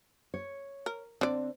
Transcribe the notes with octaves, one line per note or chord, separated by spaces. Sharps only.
C#5
A#4
D3 C4 D5